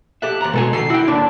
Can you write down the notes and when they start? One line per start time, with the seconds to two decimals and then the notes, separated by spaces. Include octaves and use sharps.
0.22 G4 A4 E5 F#6
0.41 D#2 A#5
0.53 B2 G#3 A4 G#5
0.73 D#3 A4 C7
0.90 E4 F#4 G5
1.08 D#2 A#2 D3 D4